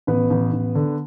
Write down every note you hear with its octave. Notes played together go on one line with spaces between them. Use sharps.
A1 B3 B4
A1
A1
D3